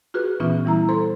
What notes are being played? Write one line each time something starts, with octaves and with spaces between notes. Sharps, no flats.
F4 F#4 G#4 B4
A#2 E3 B3 C#4 D#4 F4
E3 G3 E4 A#5
A4 C5 C6